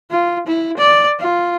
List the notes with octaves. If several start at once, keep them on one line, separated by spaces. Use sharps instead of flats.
F4
E4
D5
F4